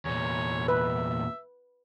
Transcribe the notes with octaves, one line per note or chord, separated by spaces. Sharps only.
E2 A#2 C#5
B4 E5